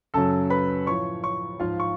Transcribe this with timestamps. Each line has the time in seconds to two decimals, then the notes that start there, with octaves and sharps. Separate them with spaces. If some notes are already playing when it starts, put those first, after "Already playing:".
0.14 F#2 C#3 F#3 A4 A5
0.50 B4 B5
0.86 A2 F3 C#5 C#6
1.23 C#5 C#6
1.60 G#2 F3 F4 F5
1.80 C#6